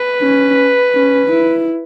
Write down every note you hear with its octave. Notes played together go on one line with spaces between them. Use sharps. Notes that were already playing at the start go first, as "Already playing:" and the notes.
Already playing: B4
C#4
C#4
E4